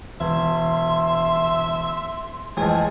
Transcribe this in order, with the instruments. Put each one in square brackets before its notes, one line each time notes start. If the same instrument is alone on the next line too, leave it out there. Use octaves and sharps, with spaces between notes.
[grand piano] E1 [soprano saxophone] E5 [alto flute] C6
[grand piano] A1 F2 [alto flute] G#3 [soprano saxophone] G#4